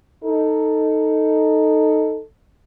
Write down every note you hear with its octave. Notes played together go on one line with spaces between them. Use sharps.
D#4 A4